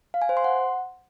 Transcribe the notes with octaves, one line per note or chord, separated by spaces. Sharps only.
F5
G#5
C5
C6
F#5